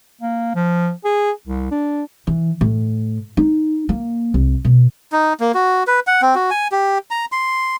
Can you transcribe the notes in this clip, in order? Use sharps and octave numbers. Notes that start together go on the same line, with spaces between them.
A#3
F3
G#4
C2
D4
E3
A2
D#4
A#3
C2
B2
D#4
A#3
F#4
B4
F#5
C4
F#4
G#5
G4
A#5
C6